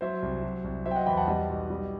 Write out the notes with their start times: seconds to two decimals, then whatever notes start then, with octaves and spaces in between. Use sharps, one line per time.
0.01 F#3 C5 E5
0.22 C2
0.43 F#3
0.64 C2
0.86 F#3 C5 E5
0.91 G5
0.96 D#5 F#5
1.06 E2 G5 B5
1.17 F#5 A5
1.27 G3 D#5 F#5
1.49 B1
1.70 G3